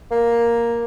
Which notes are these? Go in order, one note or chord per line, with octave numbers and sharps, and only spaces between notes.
A#3